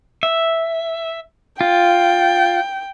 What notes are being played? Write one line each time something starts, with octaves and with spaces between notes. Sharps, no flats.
E5
F4 G5